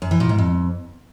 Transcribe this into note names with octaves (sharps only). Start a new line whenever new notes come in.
F#2
E3
A#2
G#2
F2